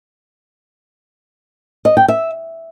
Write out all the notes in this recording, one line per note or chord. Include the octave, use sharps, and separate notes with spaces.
D#5
G5
E5